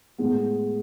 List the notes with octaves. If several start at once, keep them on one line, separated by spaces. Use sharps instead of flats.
A2 G#3 B3